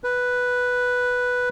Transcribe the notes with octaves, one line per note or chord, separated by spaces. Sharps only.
B4